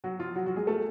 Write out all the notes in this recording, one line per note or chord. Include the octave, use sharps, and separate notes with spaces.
F#3 F#4
F3 F4
F#3 F#4
F#3 F#4
G#3 G#4
A3 A4